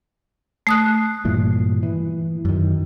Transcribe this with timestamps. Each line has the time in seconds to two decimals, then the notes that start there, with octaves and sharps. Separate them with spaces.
0.67 A3 D#6 F#6
1.25 G2 A#2 E3
1.83 E3
2.45 F#2 D#3